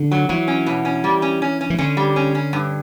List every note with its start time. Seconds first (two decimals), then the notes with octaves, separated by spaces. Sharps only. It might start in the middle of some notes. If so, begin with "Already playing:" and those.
Already playing: D3
0.11 F#3
0.29 E3 F#3
0.48 C#4
0.66 B2
0.85 C#4
1.04 G3
1.22 C#4
1.42 C#4
1.61 C#4
1.70 E3
1.78 D3 C#4
1.97 G3
2.16 C#4
2.35 C#4
2.53 G2